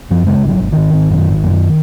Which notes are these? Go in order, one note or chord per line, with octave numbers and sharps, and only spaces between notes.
F#2 F3
C#3 G#3
G#1
F#3
G#1
G#1 D#3
G#1
F#2
G#1
F#2